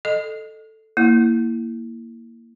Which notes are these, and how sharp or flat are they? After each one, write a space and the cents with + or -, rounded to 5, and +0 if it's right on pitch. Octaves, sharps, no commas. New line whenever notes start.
A4 +0 D#5 -15
A#3 -10 E4 +0